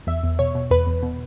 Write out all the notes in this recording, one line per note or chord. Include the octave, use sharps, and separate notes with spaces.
E2 E5
E2
B2 C#5
B2
E2 B4
E2
B2